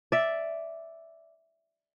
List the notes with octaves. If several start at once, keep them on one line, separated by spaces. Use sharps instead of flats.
D5 E5